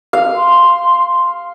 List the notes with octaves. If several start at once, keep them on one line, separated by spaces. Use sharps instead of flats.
F5
C6